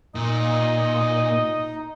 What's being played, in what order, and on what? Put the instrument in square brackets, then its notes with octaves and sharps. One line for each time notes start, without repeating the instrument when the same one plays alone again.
[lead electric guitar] A#2 [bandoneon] D#4 [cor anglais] D#5